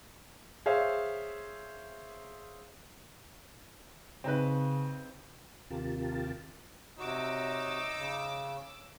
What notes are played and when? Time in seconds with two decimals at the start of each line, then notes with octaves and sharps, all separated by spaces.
0.66 G#4 C5 C#5 E5 F5
4.24 C#3 C4 D#4 B4
5.70 D#2 C3 F4 G4 A#4 A5
6.99 C3 D#4 F#4 C#5 D6 E6
7.95 C#3